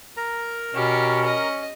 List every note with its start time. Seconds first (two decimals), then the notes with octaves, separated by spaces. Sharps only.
0.17 A#4 A#5
0.75 B2 C#4 G4
1.26 D#5